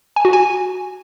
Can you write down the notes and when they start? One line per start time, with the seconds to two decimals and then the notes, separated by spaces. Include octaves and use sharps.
0.16 G#5
0.25 F#4
0.33 G#5